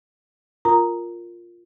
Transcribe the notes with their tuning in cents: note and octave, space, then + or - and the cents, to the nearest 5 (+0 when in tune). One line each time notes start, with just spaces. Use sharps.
F4 +0 A#4 -5 A#5 +0